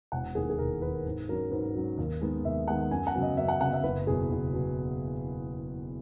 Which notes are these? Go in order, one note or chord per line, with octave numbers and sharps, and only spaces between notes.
E1 F#5
D#2 D#3 G#4
G#4
E1 A#4
D#2 D#3 B4
G#2
F#3 C#4 A#4
G#2 B4
F#3 C#4
D#2
D#3 G#3 B3
D#2 E5
D#3 G#3 B3 F#5
F#2 G#5
F#5
C#3 F#3 B3
D#5
F#2 E5
F#5
C#3 F#3 B3 F#5
E5
F#1 B4
E2 B2 F#3 G#4
F#1
B2 F#3